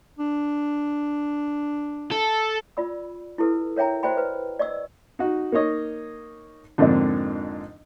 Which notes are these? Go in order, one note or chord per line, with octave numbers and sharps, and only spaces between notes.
D4
A4
F4 D5 B5 E6
E4 G4 A4 B4 E6
A#4 C#5 E5 G5 A#5
F#4 C5 D5 E5 G5 B5
B4
D5 D#5 C#6 E6
D#4 F#4
A#3 D#4 C#5 D#5
F2 G#2 D3 A#3 C4 D4